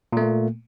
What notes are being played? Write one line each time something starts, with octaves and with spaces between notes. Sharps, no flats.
A#2 A3 A#3